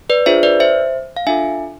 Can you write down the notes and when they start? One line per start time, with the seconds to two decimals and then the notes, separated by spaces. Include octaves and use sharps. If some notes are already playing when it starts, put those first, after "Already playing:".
0.10 B4 D5
0.26 D4 F4 G#4 C5 E5
0.43 B4 D5
0.60 C5 E5
1.17 F5
1.27 D4 F4 A4 E5 G#5